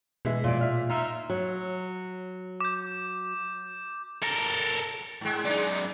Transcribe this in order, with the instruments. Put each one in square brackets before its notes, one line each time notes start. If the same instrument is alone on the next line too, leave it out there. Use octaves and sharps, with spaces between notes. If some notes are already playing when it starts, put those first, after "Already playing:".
[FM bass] B2 [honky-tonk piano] E3 G#3 E5
[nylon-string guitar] A#2 D5
[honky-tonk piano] E5 F6
[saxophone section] D#4 F4 E5 [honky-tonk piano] A#5
[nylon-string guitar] F#3
[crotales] D6 G6
[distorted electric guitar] A4 A#4
[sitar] G#2 G#3
[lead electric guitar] F#2 D5 [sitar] G#3 D#4